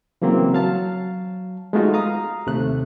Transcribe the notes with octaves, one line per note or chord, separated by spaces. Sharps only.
C#3 E3 F#3 A#3 C4
F#3 F5 A5
G#3 A3 B3 D#4 F4 F#4
F5 A#5 D#6
D#2 C3 A3 F#6